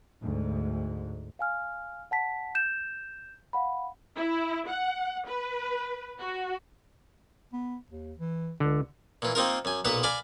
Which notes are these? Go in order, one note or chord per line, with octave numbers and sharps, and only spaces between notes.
D2 G#2
F5 G#5 F6
F#5 A5 B6
G6 E7
F5 F#5 B5
E4
F#5
B4
F#4
B3
D#2
E3
C#2 D3
A#2 E3
A#3 C4 D#4 F4 A#4
F#2 G#5
B1 A#2 B3 B4 F#5
D5 F5 G#5 B5 D6